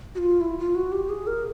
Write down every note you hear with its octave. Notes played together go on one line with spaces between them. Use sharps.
F#4
F4
E4
F4
F#4
G4
G#4
A#4